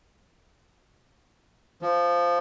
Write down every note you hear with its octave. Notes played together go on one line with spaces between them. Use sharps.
F3